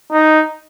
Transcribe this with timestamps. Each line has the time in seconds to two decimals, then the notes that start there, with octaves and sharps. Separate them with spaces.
0.12 D#4